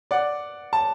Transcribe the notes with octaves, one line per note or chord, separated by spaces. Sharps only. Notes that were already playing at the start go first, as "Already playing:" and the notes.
D5 F#5
A5